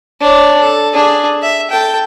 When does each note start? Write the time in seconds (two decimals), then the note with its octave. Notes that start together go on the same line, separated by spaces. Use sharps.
0.21 D4 C#5
0.60 A4
0.94 D4 G#4
1.42 E5
1.71 A4 G5